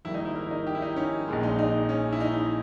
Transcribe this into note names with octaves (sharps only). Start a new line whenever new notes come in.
G#1 G#2 G3 A#3 E4
D#4
E4
A#4
D#4
G4
E4
D#4
C#4
A#1 A#2 G#3
D#4
D#4
C#4
E4
D#4